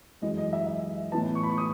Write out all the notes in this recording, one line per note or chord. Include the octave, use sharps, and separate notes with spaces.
F#2 E3 G#3 D#5
D#5
E5
E5
A2 E3 B3 A5
C#6
B5
C#6
D#6